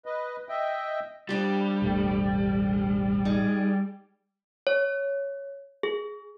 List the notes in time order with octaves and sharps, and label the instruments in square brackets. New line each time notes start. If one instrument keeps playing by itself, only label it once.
[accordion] B4 D#5
D#5 E5 G5
[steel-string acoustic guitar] F2 D4 G4 [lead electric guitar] G3
[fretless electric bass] E1 A1 A3
[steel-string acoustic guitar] D#4 G#4 D5
[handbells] C#5
G#4